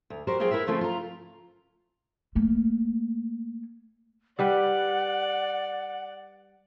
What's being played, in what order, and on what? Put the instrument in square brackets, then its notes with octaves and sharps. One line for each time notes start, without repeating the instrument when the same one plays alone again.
[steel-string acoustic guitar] D2
F#4 G4 A#4 C5 D5
F#3 A#3 F4 G#4 C5 G5
E4 A#4 B4 E5
C#3 F3 A3 C4 C#4
F4 A#5
[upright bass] A3 A#3
[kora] G3 G4 B4 [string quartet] D5 [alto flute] F#5